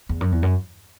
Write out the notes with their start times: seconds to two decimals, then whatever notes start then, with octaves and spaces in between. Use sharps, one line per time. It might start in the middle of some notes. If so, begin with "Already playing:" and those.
0.09 E2
0.21 F#2
0.32 E2
0.43 F#2